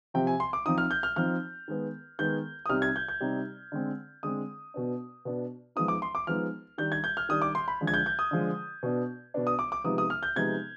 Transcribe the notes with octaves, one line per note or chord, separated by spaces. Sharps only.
C3 F3 C4 G5
G#5
C6
D6
F3 C4 D#4 D#6
F6
G6
F6
F3 C4 D#4 F6
D#3 G#3 B3
D#3 G#3 B3 G6
D#6
C3 G3 C4 D#4 F6
G#6
G6
G6
C3 G3 C4 D#4
D3 G#3 C4
D3 G#3 C4 D#6
B2 B3 D4
B2 B3 D4
F3 G#3 B3 D#4 D#6
D6
C6
D6
F3 G#3 B3 D#4 F6
D#3 G3 D4 G6
G#6
G6
F6
D#3 G3 D4 D#6
D6
C6
B5
D3 F3 G#3
G#6
G6
G6
D#6
D3 F3 G#3
B2 B3 D4
B2 B3 D4
D#6
D6
D6
C3 F3 G#3 B3 D#4 D#6
D#6
F6
G6
C3 F3 G#3 B3 D#4 G#6